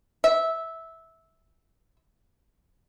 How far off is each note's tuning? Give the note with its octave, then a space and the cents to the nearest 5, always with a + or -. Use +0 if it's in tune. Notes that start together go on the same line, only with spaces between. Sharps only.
E5 -10